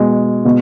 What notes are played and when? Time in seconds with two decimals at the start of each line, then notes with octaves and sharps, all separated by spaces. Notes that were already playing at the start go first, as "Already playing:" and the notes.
Already playing: B2 G#3
0.45 B2